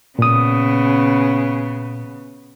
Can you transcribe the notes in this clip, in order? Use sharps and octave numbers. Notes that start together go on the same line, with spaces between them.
A#2 C#3 B3 D#6